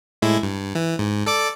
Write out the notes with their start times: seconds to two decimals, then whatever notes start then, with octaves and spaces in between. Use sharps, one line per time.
0.22 A2 G#3 E4
0.43 G2
0.75 E3
0.99 G#2
1.26 A4 D5 D6